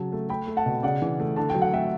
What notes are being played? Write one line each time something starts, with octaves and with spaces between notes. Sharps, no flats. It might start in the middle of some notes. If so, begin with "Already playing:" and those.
Already playing: C#3 F#3 A5
A3
A3 G5 B5
A3
F#5 A5
B2
C#3 D5 F#5
E3
A3
D3 A5
F#3 G5
F#5
A3 E5 G5